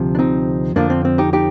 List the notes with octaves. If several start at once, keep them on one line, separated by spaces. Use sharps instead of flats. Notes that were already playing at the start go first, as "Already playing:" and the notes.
Already playing: D2 C3 F3
D4
C4 D#4
F2 D3 F3 A#3 D4
C4
C4
D#4 G4
D#4 G4